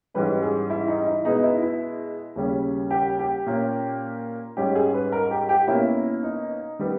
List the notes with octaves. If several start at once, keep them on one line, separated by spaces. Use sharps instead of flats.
G#2 E3 G3 C#4 B4
G#4
E4
D#4
D#4
E4
B2 G#3 B3 D#4
E4
E4
D#2 C#3 G3 C#4
G4
G4
A#2 A#3 C#4
G#2 G3 C#4 G4
G#4
B4
A#4
G4
G4
B2 A#3 C#4 E4
D#4
D#3 G3 B3